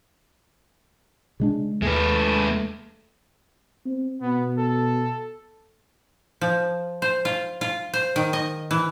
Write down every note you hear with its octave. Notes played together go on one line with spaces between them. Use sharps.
C#3 G#3 D4
D#2 G#3 A3 B4
C4
B2 B3
A4
F3
C5
F4
F4
C5
D#3
D#5
E3